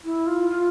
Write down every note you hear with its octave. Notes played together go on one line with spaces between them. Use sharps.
E4
F4
F4